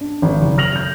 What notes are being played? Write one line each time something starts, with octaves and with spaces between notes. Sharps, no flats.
D4
G#1
F#1
F6 A#6 F7 F#7
G6